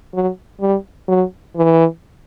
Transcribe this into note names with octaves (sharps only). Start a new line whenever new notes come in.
F#3
G3
F#3
E3